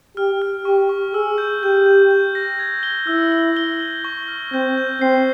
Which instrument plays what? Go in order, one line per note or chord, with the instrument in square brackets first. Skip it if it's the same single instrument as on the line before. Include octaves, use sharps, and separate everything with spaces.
[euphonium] G4 [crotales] F6
[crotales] F6
[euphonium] G4 [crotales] C#6
[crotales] C#6
[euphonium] G#4 [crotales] E6
[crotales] G6
[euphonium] G4 [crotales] G6
[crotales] G6
G6
A#6
G#6
G7
[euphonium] E4 [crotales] E6
[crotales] G7
G7
G6
C#6
F6
[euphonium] C4 [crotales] G6
[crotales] G6
[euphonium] C4 [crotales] C7